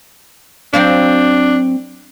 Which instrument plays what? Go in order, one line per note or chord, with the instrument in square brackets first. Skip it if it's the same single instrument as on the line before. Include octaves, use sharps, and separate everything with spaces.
[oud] F#3 C4 F5 [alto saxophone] D4